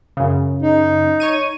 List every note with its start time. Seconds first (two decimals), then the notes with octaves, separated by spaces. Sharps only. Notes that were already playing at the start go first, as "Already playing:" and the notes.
0.17 F#2 C#3
0.62 D#4
1.20 C#5 C#6 D#7